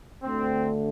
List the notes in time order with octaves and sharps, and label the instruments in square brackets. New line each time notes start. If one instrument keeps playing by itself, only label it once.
[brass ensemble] D2 D3 A3 C4